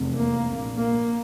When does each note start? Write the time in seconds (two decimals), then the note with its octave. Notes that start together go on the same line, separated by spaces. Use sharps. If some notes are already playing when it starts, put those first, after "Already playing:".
Already playing: F1 E2 C3
0.16 A#3
0.47 A#1 A#2
0.78 A#3